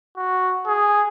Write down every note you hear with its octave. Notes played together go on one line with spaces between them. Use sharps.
F#4
G#4